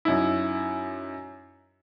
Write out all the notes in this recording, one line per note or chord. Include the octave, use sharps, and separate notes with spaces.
F#2 D#4 E4